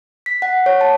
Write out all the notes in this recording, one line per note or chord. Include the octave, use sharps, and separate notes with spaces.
B6
F#5
C#5
A5